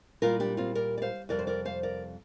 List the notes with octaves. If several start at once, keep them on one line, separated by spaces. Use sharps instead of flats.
A#2 G3 F4 A#4
D4 G4
C4 F4
A#4 D5
D5
C5 F5
F2 C3 G3 A#4 D5
C5
A#4 D5
C5 F5
A#4 D5